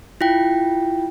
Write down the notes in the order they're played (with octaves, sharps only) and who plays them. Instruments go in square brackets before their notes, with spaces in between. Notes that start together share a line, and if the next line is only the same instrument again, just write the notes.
[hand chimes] E4 F4 G5